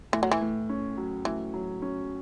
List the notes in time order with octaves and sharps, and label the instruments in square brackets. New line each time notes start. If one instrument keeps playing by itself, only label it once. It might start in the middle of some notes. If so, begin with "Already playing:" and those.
[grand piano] A2 [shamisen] E3
[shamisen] F#3
E3
[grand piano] A2
C#4
F#3
[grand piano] A2 [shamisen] E3
[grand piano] F#3
C#4